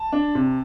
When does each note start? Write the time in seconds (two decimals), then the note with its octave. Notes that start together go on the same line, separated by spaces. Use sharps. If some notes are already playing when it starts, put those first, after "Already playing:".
Already playing: A5
0.13 D4
0.35 C3